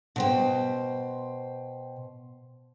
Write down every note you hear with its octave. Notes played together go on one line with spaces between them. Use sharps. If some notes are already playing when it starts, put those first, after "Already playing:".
B2 C5 G5